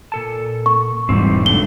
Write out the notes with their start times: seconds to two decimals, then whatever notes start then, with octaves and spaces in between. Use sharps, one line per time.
0.12 A#2 A4 A5
0.66 C#6
1.09 E1 G#2 E3 G3 C4
1.46 B2 A3 D4 G7